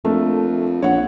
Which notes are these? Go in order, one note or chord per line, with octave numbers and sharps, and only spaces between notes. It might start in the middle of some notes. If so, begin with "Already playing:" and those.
F2 A3 A#3 D4
A#1 C#5 F#5